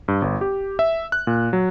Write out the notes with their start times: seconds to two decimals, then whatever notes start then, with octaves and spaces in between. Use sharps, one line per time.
0.08 G2
0.22 G1
0.41 G4
0.79 E5
1.12 F#6
1.27 A#2
1.53 F#3